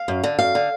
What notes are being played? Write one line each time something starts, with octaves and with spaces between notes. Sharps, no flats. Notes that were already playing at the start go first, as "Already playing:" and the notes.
Already playing: F5
F#2
D3
F#2 F5
D3